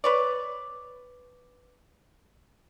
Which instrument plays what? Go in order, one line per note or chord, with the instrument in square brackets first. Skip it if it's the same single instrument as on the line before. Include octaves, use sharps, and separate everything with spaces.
[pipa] B4 C#5 D5